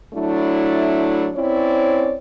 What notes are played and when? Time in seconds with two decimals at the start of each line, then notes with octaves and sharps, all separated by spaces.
0.14 F#3 A3 D4 E4
1.35 C4 C#4 E4 C#5 D5